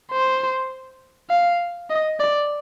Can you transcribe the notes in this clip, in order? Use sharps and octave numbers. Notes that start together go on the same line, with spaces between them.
C5
F5
D#5
D5